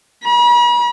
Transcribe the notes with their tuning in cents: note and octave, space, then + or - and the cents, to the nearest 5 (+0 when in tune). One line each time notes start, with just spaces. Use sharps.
B5 -45